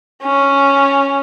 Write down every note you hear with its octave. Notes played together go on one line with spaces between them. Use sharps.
C#4